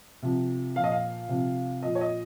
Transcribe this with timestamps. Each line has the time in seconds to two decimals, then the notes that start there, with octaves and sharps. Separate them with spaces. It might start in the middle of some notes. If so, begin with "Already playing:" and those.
0.22 C3 F3
0.76 A#2 F3 F5
0.84 D#5
0.92 F5
1.29 C3 F3
1.82 A#2 F3 D#5
1.95 C#5
2.01 D#5